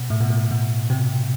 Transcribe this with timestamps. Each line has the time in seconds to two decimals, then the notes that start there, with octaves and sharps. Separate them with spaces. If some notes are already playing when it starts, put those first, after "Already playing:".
Already playing: B2
0.10 A2
0.21 B2
0.30 A2
0.51 B2
0.90 C3